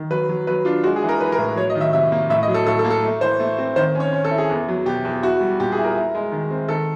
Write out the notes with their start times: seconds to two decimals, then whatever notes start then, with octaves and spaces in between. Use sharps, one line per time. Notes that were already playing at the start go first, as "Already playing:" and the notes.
Already playing: D#3
0.10 F#3 B4
0.29 F#3
0.47 F#3 B4
0.65 D4 F4
0.84 G#3 F#4
0.96 G#4
1.03 E3
1.09 A#4
1.20 E3 B4
1.32 A#4
1.38 A2
1.56 F#3 C#5
1.70 D#5
1.75 D#3
1.81 E5
1.93 C3 E5
2.12 A#3
2.30 A2 E5
2.43 D#5
2.48 F#3
2.54 A4
2.67 A2 A4
2.79 A4
2.84 A#3
2.90 A4
3.04 A3
3.21 E3 C5
3.40 A3
3.58 C4
3.76 D#3 C5
3.95 C#4
4.00 C#5
4.13 C#4
4.25 A4
4.31 E4
4.38 G#4
4.50 E2
4.68 F#3
4.86 B2 G4
5.05 E2
5.23 E4 F#4
5.40 G3
5.60 A#2 G4
5.72 G#4
5.78 E4
5.84 A#4
5.96 E4
6.15 G#3
6.32 D#3
6.51 C4
6.68 D#3 A4